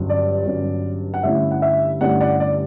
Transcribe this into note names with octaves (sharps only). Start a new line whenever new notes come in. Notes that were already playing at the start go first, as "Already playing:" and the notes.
Already playing: G1 G2 F#3 C#4
D5
G1 G2 F#3 C#4
F#5
G2 D3 A3 C#4 E4 E5
F#5
E5
G2 D3 A3 C#4 E4 D5 F#5
D5 F#5
D5